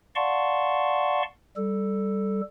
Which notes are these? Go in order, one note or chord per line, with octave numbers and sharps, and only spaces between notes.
D5 F5 F#5 A5 C6 C#6
G3 A4